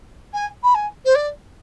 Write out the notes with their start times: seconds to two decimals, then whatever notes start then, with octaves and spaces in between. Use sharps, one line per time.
0.33 G#5
0.63 B5
0.74 G#5
1.05 C5
1.15 D5